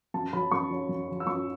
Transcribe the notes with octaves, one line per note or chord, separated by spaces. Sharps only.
F#2 A5
F#3 C#4 B5
F#2 C#6
F#3 C#4
F#2
F#3 C#4
E6
F#2 C#6